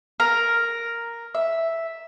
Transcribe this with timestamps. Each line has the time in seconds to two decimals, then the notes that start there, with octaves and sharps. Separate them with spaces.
0.20 A#4
1.35 E5